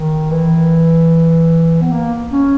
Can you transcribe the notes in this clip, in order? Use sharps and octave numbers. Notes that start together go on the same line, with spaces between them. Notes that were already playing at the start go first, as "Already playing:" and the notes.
Already playing: D#3
E3
B3
A#3
C#4